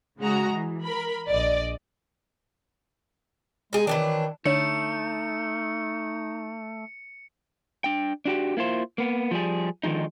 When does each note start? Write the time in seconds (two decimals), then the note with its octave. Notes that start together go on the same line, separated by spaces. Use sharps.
0.21 C#3 G#3 F#4 A#5
0.50 E3
0.83 A#4 B5
1.28 A#1 D5 D#5
3.73 G#3 D#4 G#4
3.87 D#3 E3 F#3 D4
4.46 D3 A3 D4 D#4 C#5 C#7
7.84 D4 G5
8.25 D4 F#4 G4
8.57 A#3 E4 F4 C5
8.98 A#3 B3
9.31 F3 G3 G#4
9.84 D3 D#3 F3 G#3 D#4